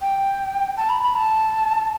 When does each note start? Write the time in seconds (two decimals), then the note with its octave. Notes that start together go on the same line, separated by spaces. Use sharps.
0.01 G5
0.77 A5
0.89 B5
1.03 B5
1.16 A5